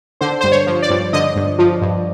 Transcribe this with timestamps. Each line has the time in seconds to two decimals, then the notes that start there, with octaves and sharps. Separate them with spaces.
0.21 D3 C5
0.41 G2 C5
0.52 C#5
0.66 F3
0.82 D5
0.90 G2
1.13 D3 D#5
1.36 G2
1.59 F3
1.82 G2